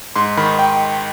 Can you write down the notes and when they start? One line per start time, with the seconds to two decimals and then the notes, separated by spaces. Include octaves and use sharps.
0.16 G#2 C6
0.37 D#3 B5
0.59 G5